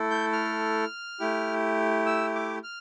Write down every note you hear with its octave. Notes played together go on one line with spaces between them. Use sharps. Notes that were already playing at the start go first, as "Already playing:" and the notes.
Already playing: A3 E4 A4
G6
F6
A3 E4 G4
E6
D6
F6